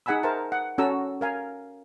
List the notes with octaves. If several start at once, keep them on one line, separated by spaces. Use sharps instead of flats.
D#4 G#4 F#5 G#5 B5 E6
A#4 C5 E5 A5
F#5
C#4 F#4 A4 A#5 E6
A#4 F5 G#5